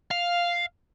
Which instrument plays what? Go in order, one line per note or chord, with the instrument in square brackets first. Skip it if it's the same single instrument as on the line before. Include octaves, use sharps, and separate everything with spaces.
[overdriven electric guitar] F5